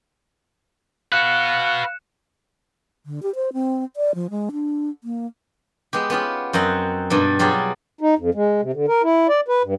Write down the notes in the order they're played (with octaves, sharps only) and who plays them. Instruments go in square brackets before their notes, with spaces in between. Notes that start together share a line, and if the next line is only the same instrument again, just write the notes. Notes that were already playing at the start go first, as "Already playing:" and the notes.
[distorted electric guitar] F#4 B4 [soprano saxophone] F5 [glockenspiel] F#6 C#7 E7
[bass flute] D3
G4
C5
C4
D5
F3
G#3
D4
A#3
[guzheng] G#3 B3 G4
B3 C#4 F4 G4
F#2 C4 D#5 F#5
G2 B2 G3
F#3 G3 F4 G4 G#4
[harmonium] D#4
F2
G#3
C3
D3
A#4
E4
D5
B4
G2